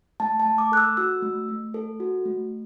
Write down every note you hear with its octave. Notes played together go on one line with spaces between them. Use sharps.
A3 A5
A5
A3
D6
A4 F#6
E6
F#4 E6
A3
A3
A4
F#4
A3